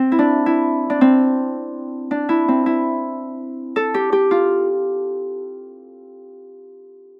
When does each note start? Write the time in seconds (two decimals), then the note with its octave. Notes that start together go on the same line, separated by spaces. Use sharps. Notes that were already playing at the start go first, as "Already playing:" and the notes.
Already playing: C4
0.12 E4
0.19 D4
0.46 E4
0.90 D4
1.01 C4
2.11 D4
2.29 E4
2.48 C4
2.66 E4
3.76 A4
3.94 G4
4.13 G4
4.31 F4